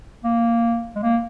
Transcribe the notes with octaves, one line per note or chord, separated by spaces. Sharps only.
A#3
G#3
A#3